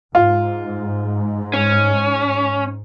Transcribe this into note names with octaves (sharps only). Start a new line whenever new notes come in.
G#2 F4
C#4